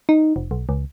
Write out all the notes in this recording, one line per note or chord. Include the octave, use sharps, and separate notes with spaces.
D#4
F1
B1
C#2